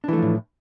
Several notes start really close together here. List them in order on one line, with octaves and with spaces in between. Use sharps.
D4 E3 A3 F3 A2